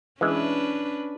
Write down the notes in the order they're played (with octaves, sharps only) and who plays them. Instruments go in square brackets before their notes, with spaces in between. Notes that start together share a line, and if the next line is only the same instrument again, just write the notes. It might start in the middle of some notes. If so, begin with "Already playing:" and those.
[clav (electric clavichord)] E3 G#3 [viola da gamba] C#4 D4 B4